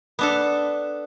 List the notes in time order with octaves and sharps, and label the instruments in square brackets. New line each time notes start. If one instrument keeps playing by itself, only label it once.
[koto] B3 D4 A4